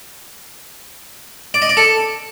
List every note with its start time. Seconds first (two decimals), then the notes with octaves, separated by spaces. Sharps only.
1.54 D5
1.62 D#5
1.69 D5
1.77 A4